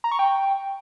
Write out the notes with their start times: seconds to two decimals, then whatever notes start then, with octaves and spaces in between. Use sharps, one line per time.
0.04 A#5
0.12 C#6
0.19 G5